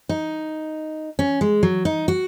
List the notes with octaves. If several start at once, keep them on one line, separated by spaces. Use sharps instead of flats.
D#4
C#4
G#3
F#3
D#4
F#4